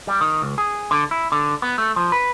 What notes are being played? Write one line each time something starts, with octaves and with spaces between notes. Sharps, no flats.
G3
D#3
C#2
G#4
D3
E4
D3
B3
A3
F3
B4